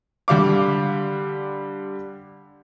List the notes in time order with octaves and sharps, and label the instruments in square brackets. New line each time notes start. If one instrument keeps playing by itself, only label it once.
[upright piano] D3 G3 F5 D6